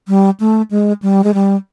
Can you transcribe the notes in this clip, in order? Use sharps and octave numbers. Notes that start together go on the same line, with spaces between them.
G3
A3
G#3
G3
G#3
G3